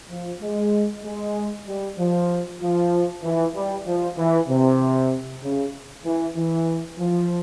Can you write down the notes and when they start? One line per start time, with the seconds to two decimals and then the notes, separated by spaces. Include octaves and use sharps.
0.10 F3
0.42 G#3
1.04 G#3
1.67 G3
1.98 F3
2.61 F3
3.23 E3
3.55 G3
3.86 F3
4.17 E3
4.49 C3
5.43 C#3
6.05 E3
6.36 E3
6.99 F3